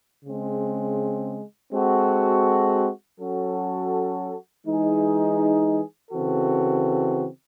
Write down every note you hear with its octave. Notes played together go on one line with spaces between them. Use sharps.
C#3 G#3 C4
G#3 C4 F#4 A4
F#3 C#4 F#4 A4
E3 G#3 D#4 G#4
C#3 E3 C4 F#4 A4